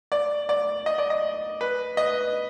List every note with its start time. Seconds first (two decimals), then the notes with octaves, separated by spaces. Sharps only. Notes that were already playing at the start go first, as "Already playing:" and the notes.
0.12 D5
0.49 D5
0.86 D#5
0.98 D5
1.10 D#5
1.61 B4
1.97 D#5